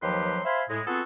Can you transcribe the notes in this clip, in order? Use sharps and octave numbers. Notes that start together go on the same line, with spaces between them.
D#2 F3 F#3 G4 B4 C6
C5 E5 F5 G#5 B5 C6
A2 G#3
B3 C4 F4 F#4 G#4 A4